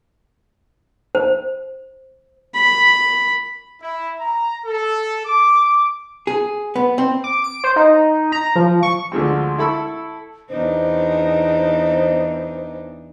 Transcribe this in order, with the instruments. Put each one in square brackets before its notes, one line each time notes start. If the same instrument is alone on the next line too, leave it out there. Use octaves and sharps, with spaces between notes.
[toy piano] C5
[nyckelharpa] B5
[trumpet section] E4
A#5
A4
D6
[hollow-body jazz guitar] G#4
B3
C4
[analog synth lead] D6
D7
C5
D#4
A#5
F3
C#6
[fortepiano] D2 D3 F3 G#3 C4
E4 A4 B5 C#6 E6
[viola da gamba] E2 D4 D#4 [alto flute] C5